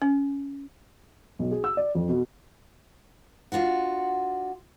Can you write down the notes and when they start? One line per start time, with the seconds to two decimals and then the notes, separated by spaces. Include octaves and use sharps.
0.02 C#4
1.39 B1
1.51 G#4
1.64 E6
1.77 D5
1.95 F2
2.09 B2
3.52 D4 F4 F#4 F#5